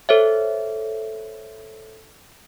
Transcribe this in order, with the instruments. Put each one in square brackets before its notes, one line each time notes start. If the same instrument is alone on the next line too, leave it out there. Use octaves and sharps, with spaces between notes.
[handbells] A4 C5 C#5 E5